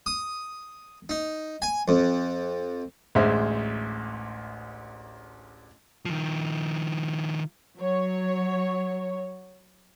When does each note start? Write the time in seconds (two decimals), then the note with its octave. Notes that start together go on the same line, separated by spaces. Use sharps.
0.06 D#6
1.09 D#4
1.62 G#5
1.88 F2
3.15 A1 D2 G#3 C5 E5
6.05 D#3 F3
7.77 F#3 C#5